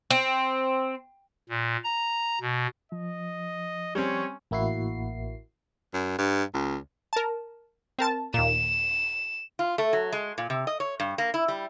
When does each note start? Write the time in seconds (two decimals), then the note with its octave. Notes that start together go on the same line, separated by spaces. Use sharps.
0.11 C4
1.49 A#2
1.84 A#5
2.41 B2
2.92 F3 D#5
3.95 G3 C4 C#4 C#5
4.51 A1 A#3 E4 F#4 C7
5.94 F#2
6.18 G2
6.54 C#2
7.13 A#4 A5
7.99 C4 A#4 A5
8.34 D#2 A#2 E7
9.59 F4
9.78 A3
9.93 F#3
10.13 G#3
10.38 A#2
10.50 C3
10.67 D#5
10.80 C#5
11.00 G2
11.18 A#3
11.34 E4
11.48 G3